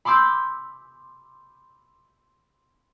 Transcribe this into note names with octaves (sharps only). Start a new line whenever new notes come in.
B5 C6 D6 E6 G6